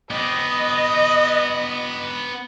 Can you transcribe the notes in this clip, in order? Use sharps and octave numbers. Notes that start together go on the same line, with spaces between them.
B3 G4 D#5